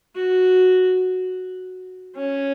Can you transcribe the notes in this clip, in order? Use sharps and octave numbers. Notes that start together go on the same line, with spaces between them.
F#4
C#4